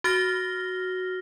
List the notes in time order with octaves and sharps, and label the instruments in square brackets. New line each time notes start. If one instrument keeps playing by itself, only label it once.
[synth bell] F#4 F6 A#6 G7